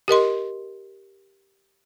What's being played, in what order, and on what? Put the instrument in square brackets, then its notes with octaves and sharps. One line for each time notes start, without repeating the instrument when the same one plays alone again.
[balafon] G4 A#4 D#5 C6